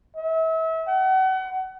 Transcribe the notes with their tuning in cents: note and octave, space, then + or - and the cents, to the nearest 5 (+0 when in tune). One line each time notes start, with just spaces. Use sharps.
E5 -35
F#5 +35